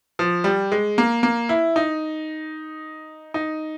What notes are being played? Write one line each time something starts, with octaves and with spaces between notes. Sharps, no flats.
F3
G3
G#3
A#3
A#3
E4
D#4
D#4